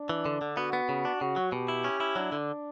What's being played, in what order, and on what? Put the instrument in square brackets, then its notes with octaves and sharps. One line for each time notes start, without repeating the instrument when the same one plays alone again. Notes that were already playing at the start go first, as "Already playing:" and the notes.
Already playing: [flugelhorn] D4
[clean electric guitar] E3
D3
D3
[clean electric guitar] B3 [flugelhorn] F#4
[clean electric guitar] B3
C#3
D4
[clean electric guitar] C#3 [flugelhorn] F#4
[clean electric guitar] F#3
[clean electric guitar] B2 [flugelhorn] G4
[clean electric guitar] E4
C#4
E4
[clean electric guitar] F#3 [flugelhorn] D4
[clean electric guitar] D3